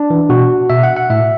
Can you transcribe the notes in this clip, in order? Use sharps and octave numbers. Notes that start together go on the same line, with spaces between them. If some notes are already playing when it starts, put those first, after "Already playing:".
Already playing: D4
E3
B2 F#4
B2 E5
F#5
F#5
A2 E5